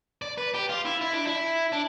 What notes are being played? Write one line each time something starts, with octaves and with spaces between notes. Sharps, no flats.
D5
B4
G4
F4
E4
E4
D4
E4
D4